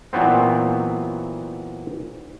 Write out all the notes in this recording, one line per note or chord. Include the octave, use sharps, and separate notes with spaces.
A#2 E3 F#3 B3 C4